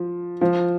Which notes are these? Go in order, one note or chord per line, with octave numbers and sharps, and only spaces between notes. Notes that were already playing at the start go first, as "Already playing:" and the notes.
Already playing: F3
F3